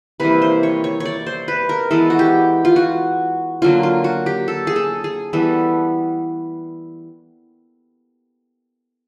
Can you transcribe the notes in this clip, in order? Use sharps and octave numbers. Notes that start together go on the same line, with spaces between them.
C3 E3 G3 A#3 B4
C5
C#5
C#5
C#5
D5
C5
B4
A#4
E3 G#3 B3 A4
F#4
G4
F4
F#4
D3 F#3 A#3 F4
F4
F#4
G4
A4
G#4
A4
G#4
E3 G3 B3 A4